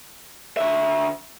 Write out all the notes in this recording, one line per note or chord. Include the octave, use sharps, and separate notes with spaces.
D3 E5